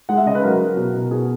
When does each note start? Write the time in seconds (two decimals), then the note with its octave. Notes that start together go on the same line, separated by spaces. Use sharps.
0.09 G#3 F#5
0.17 E5
0.26 C#3 D#5
0.35 B4
0.43 F#3 A#4
0.60 F#3
0.77 B2
0.94 B2
1.11 B2 G#4